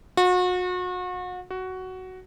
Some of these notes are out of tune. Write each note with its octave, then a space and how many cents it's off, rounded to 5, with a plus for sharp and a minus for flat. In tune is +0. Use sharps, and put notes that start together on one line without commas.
F#4 -35
F#4 +10